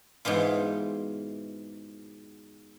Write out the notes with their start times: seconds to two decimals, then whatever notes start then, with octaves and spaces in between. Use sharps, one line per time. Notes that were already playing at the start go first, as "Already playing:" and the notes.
0.25 G#2 B2 E3 F4